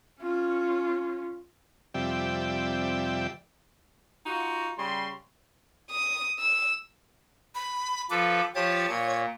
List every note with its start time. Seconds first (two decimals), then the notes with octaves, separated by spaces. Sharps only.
0.21 C#4 F4
1.94 F2 C3 G3 D5 E5 G5
4.25 D#4 F4 F#4
4.77 C#3 G3 C6
5.91 D#6
6.39 E6
7.55 B5
8.10 F3 A4 B4 D6
8.55 F3 G4 C#5 A5
8.89 A#2